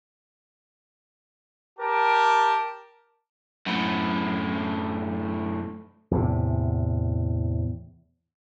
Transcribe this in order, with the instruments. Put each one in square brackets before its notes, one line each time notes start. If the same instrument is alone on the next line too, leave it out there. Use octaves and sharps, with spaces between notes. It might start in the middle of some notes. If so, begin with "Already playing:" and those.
[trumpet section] G4 A#4 A5
[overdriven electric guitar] F#2 A2
[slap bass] E2 A2 C3